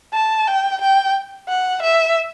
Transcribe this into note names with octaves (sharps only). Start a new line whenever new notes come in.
A5
G5
G5
F#5
E5